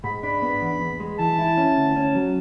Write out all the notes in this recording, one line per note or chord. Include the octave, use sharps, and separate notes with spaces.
G#2 B5
D4 B5
B3
E2
E2
G#3
E3 A5
E4
C#4
D2
C#4
F#3